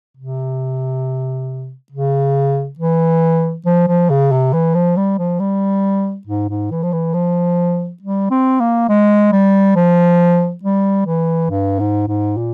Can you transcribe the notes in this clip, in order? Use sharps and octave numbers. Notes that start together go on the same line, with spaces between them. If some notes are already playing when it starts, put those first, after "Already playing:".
C3
C#3
E3
F3
F3
C#3
C3
E3
F3
G3
F3
G3
G#2
G#2
E3
F3
E3
F3
G3
C4
A#3
G#3
G3
F3
G3
E3
G2
G#2
G#2
A#2